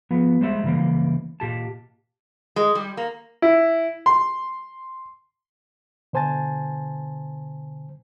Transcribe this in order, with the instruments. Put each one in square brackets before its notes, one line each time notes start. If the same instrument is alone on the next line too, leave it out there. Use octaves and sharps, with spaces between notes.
[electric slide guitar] F3 B3
G3 G#3 C5 D5 E5
C#3 E3 G3 A#3
A#2 G4 A5
[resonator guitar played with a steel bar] G#3
G3
A#3
[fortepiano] E4
C6
[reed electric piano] B2 D3 C5 G#5 A5 A6